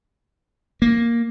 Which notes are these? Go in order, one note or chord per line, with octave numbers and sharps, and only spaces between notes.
A#3